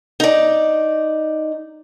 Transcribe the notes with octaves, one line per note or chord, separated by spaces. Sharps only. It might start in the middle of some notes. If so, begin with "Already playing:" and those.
D#4 D5